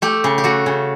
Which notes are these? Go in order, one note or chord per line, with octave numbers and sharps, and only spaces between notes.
A3 G4
C#3
G4
A3 F#4
C#3